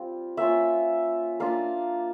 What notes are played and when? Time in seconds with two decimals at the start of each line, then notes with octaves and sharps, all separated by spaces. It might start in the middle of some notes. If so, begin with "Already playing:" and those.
Already playing: G3 C4 F4
0.37 A#3 C#4 F4 E5
1.40 A#3 D4 F4 F5